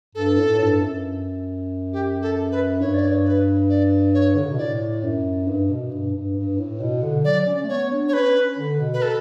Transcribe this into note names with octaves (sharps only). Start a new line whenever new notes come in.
G2 A4
A2
G2
F#2
G4
A4
B4
G2 C#5
D5
C#5
B4
D5
C#5
D3
C#3
B2
A2 D5
F#2
G2
B2
G2
G2
G2
A2
B2
D3
F#3 D5
C#4
A3
B3 C#5
D4
C#5
C#4 B4
C#4
D3
B2
B4
A4